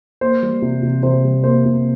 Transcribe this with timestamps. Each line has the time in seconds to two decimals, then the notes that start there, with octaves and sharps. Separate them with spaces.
0.21 A#3 C5
0.43 G3
0.62 C3
0.83 C3
1.03 C3 C5
1.24 G3
1.44 A#3 C5
1.65 C3